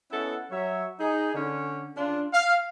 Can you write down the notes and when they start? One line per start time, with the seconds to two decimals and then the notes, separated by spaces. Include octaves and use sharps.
0.12 B3 C#4 E4 A4 D#5 F#5
0.51 F#3 C#5 E5
1.00 D#4 G#4
1.34 D3 C#4
1.96 C#3 D4 F4
2.34 F5